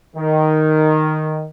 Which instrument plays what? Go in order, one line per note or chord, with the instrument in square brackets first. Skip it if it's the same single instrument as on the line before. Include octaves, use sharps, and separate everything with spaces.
[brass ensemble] D#3